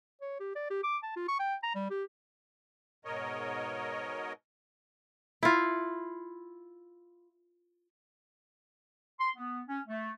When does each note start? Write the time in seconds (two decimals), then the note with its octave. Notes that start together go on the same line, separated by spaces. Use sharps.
0.21 C#5
0.40 G4
0.55 D5
0.70 G4
0.84 D6
1.03 A5
1.16 F4
1.28 C#6
1.40 G5
1.63 A#5
1.75 G3
1.90 G4
3.05 G#2 B2 A#4 C#5 D#5
5.43 E4 F4
9.19 C6
9.37 B3
9.67 C#4
9.87 A3